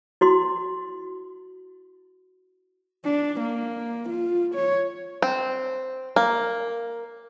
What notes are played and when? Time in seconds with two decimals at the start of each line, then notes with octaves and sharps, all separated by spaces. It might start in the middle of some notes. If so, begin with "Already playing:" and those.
0.21 E4 F#4 C6
3.05 D4
3.40 A#3
4.09 F4
4.55 C#5
5.22 C4
6.16 A#3